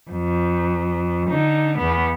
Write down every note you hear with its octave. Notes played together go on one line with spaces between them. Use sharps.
F2
D3 D#4
E2 B3